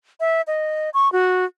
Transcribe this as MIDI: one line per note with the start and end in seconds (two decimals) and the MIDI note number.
0.20 0.41 76
0.47 0.90 75
0.94 1.11 85
1.12 1.45 66